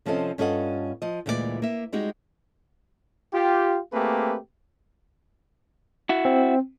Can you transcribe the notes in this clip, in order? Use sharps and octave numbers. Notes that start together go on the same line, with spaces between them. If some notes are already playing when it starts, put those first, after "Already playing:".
C3 F3 C4 C#4 A4 D#5
G2 C#4 F4 A4 D#5 F#5
F3 D#5
D2 A#2 E3 G#3 F#4 D5
A#3 E5
G3 G#3 D#4 F#4 G4
F4 G4
A3 A#3 C4 G4 G#4 B4
E4 F#4
C4